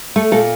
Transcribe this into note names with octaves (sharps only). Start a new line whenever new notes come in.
A3 A4
A#2 A4